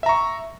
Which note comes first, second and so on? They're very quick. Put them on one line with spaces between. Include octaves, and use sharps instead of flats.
E5 A#5 C#6